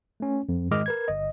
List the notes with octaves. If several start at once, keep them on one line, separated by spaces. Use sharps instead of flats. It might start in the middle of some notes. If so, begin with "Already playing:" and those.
A3 C#4
F2
G#2 D#3 G#3 D#5 D6 F6
A#4 B4 G#6
G1 D#5